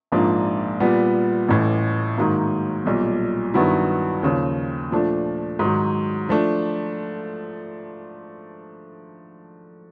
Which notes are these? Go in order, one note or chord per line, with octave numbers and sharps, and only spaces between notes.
A#1 G#2 F3 A#3 D4
A#2 G3 B3
A1 A2 E3
G#2 D#3 F#3 A#3
B1 A#2 G3
G2 D#3 F#3 B3 E4
D#2 C#3 F3
A#2 F3 A3 D4
G#2 D#3 F#3
F3 A3 D4